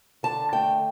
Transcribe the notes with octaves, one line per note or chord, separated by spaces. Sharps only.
D3 A5
A3 G5